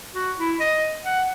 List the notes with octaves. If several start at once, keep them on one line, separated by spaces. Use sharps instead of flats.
F#4
E4
D#5
F#5